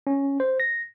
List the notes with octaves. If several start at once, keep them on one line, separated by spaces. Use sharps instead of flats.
C#4
C5
A#6